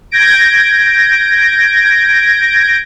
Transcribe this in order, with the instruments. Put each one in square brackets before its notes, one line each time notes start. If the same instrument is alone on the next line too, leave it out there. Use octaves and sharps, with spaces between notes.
[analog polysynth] G6 G#6 A#6 D7